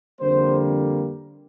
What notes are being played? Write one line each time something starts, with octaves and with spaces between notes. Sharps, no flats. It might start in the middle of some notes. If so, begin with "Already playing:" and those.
F2 D3 G3 A#3 C5